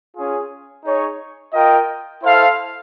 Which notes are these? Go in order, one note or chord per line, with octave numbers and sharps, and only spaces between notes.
C#4 F4 G#4
D#4 G#4 C#5
F4 A#4 D#5 G5
E4 A4 C5 F5